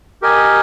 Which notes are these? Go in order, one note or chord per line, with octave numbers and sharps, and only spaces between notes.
G4 A#4 D#5 G#5